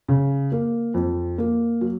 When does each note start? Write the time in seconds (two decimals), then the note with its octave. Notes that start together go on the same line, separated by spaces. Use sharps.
0.08 C#3
0.52 A#3
0.94 F2
1.38 A#3
1.81 F#3